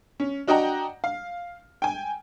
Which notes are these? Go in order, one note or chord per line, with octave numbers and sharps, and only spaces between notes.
C#4
D4 F#4 D#5 F#5 G5 A#5
F5
G5 G#5